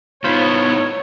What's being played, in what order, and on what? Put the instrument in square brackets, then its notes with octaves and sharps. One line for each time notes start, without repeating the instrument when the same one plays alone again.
[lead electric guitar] A2 B3 [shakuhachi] D#4 [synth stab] F4 C5 B5 [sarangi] C#5